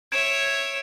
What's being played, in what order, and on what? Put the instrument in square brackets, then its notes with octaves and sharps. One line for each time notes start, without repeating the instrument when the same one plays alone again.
[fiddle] C#5 E5 [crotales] G#6 D7 E7